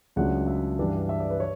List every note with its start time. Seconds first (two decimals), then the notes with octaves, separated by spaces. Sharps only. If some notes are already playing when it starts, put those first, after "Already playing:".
0.16 C#2 C#3 F#3 A3 D4 F#5
0.47 E5
0.79 G2 E3 G3 D4
1.09 E5
1.20 D5
1.30 B4
1.40 C#5